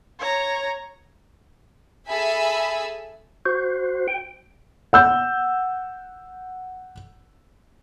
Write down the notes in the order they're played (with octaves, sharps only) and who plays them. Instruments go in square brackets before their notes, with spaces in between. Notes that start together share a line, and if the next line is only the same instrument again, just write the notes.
[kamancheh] C#5 A#5
[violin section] G#4 A4 E5 G#5 B5 E6
[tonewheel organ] F#4 C5
G5
[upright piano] F#5 E6 G6